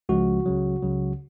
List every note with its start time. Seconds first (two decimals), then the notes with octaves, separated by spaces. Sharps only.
0.09 C#2 C#3 F3 G#3 F#4
0.46 C#2 C#3 F#3
0.82 C#2 C#3 F#3